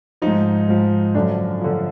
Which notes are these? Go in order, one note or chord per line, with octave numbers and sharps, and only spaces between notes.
G#2 F3 D#4
G#2 F3
F#2 D3 F3 D4
D3 F3